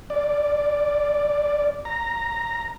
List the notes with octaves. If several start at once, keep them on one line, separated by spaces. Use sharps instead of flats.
D5
A#5